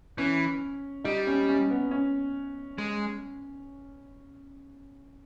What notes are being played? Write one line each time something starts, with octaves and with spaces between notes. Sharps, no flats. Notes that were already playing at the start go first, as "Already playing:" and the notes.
E3 C#4
G3 D#4
C#4
C#4
B3
C#4
G#3